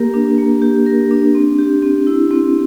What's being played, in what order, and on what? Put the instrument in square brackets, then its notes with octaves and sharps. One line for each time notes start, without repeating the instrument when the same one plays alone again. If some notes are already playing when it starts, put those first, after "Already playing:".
Already playing: [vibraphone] A#3 G4 A#4
D4
A#3
G4
A#4
D4
C4
G4
C4
E4
C4